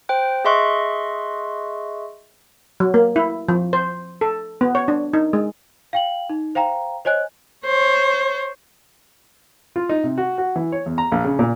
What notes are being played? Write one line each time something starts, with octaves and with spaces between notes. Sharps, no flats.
C5 G5 F#6
G#4 D#5 E5 C6 C#6 F#6
F#3
A#3
E4
F3
C5
A4
B3
C#5
D4
D#4
G#3
F5 G5 F#7
D#4
C5 F5 G5 A#5
C5 C#5 D#5 G#5 F#6
C5 C#5
F4
D#4
C3
F#4
F#4
E3
C#5
E2
A#5
A#1
C#3
A#2